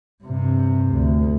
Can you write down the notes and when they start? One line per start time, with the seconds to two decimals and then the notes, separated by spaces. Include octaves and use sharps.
0.23 G2 C3
0.94 D2